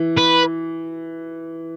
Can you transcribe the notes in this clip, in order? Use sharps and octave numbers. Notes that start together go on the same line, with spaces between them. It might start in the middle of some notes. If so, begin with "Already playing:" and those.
Already playing: E3
B4